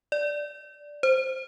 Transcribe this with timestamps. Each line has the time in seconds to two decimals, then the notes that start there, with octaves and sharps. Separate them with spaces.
0.12 D5
1.03 C5